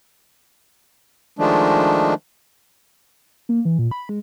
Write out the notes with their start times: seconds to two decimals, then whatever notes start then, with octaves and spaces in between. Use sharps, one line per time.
1.39 D#3 F3 G#3 A3 D4
3.49 A#3
3.65 E3
3.79 A#2
3.91 B5
4.09 G#3